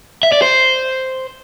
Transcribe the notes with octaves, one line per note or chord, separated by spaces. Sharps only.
E5
D5
C5